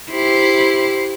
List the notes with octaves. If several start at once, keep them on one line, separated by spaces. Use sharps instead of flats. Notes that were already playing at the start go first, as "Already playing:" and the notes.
E4 G4 C5